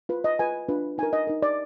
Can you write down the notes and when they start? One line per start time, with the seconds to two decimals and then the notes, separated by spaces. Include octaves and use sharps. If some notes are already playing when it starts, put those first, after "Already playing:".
0.09 F4 B4
0.24 D#5
0.39 F4 B4 G#5
0.69 D4 F4 B4
0.98 D#4 A#4 G#5
1.13 D#5
1.27 D#4 A#4
1.42 D5